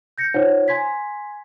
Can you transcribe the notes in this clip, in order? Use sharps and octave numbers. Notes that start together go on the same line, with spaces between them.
G6 A#6 C#7
D#4 F4 C5 C#5 F#5
G#5 C6 G#6 B6